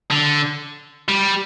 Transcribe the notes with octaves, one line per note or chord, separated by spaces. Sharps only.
D3
G3